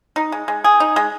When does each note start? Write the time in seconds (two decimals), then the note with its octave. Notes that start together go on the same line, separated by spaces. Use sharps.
0.16 D#4
0.32 G#3
0.48 G#3
0.64 G#4
0.80 D#4
0.96 G#3